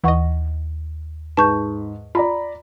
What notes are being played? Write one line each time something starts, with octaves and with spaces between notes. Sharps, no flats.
D#2 E3 D#5 F#5 C#6
G#2 B4 A5 C#6 G6
F4 D5 A#5 B5